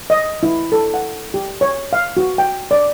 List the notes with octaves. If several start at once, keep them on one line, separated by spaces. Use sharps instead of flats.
D#5
E4
A4
F#5
G4
C#5
F5
F#4
G5
D5